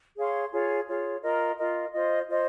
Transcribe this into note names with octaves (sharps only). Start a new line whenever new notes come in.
G#4 C#5 F5 C6
F4 G#4 C#5
F4 G#4 C#5
F4 A#4 D#5
F4 A#4 D#5
F4 C5 D#5
F4 C5 D#5